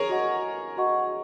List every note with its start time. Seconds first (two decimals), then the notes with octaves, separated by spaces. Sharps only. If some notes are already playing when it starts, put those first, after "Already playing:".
Already playing: G#4 A#4 C#5
0.09 F#4 D#5 F#5 C#6
0.77 F#4 D#5 F#5 C#6